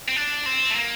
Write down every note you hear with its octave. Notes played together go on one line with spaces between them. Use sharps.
C4
D4
C4
A3
A#3